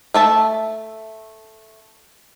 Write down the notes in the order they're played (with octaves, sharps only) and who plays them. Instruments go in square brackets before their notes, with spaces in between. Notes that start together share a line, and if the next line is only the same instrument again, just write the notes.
[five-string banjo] A3 E5 A5